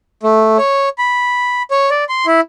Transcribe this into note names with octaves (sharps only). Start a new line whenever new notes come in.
A3
C#5
B5
C#5
D5
C6
E4